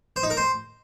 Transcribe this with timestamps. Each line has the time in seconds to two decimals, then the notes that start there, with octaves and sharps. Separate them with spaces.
0.16 C5
0.23 D#4
0.30 A#4
0.37 C5